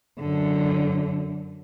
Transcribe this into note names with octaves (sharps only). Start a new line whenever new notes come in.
F#2 D3